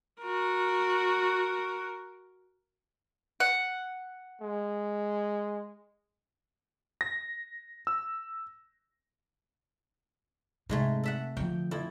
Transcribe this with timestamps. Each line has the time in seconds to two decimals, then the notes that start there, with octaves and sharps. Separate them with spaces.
0.22 F#4 A#4
3.40 F#5
4.41 G#3
7.01 A#6
7.87 E6
10.69 G#2 C3 G#3 A3
11.04 A4 E5 F#5
11.37 D3 F3 G5
11.71 F2 E4 A4